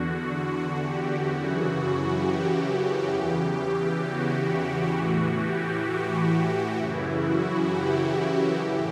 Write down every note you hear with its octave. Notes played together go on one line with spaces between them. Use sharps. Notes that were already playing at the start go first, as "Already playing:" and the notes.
Already playing: E2 D3 F#4
G4
F#2 C#3 E3 F#4
G4
E2 C#3 E3
G4
F#4
G4
A2 E3 F#4
G4
F#4
F#2 C#3 E3 E4
F#4
G4
A2 E3